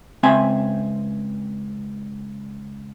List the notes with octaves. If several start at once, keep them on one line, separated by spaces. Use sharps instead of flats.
C#2 C4 E5 G#5